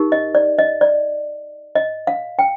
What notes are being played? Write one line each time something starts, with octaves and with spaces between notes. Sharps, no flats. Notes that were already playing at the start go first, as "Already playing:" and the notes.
Already playing: D#4 G4 A#4
D#5
D5
D#5
D5
D#5
F5
G5